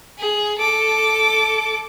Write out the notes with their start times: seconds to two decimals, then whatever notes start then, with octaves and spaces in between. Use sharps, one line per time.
0.19 G#4
0.59 A4 D6